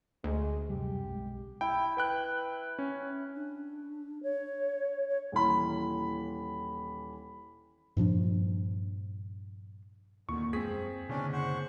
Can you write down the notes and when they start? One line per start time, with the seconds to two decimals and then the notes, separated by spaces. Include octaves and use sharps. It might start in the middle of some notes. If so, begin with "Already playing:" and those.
0.24 D2 G#3
0.70 F#2 C3 G3 G4
1.06 B1 G#3
1.61 E4 G5
1.97 B4 G5 F#6
2.79 C#4
3.35 D4
4.23 C#5
5.09 C#5
5.32 D#1 E3 B5
7.97 G2 A#2 F3 D4
10.29 D#2 A#2 D3 D#3 C4 C#6
10.53 E1 F#2 F3 G#3 C4 G#4 B6
11.09 F#1 B2 D3 C#4 D4
11.33 C5 F#5 C#6